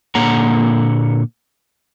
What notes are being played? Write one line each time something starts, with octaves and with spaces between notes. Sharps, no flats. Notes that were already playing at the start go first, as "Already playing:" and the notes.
A#2 D3 A#3 C#5 F#5 A#5